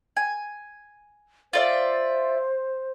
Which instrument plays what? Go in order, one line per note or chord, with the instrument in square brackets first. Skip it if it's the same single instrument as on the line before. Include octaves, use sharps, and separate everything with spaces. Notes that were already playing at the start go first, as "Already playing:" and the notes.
[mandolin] G#5
[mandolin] F4 D5 E5 [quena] C5